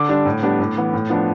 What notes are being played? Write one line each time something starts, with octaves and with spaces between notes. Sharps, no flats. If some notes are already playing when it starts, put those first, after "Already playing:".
Already playing: D3 D6
G3 D4
A2
G3 B3 D4
A2
E3 B3
A2
F3 B3 D4